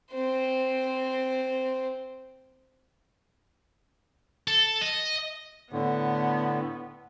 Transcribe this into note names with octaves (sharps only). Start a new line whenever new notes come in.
C4 C5
A4
D#5
A2 D3 B3